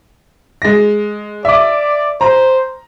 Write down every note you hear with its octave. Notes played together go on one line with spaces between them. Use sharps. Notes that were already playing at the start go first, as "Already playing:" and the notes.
G#3 A#6
D5 E5 D6
C5 A#5